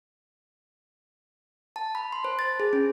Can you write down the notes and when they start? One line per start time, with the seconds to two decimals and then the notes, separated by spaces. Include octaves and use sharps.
1.76 A5
1.95 B5
2.12 C6
2.24 C5
2.39 A6
2.60 G#4
2.73 C#4